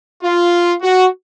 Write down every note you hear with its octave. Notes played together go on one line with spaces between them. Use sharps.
F4
F#4